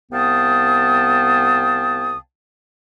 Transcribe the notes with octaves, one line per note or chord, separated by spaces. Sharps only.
C2 B3 F5 G5 A5 D#6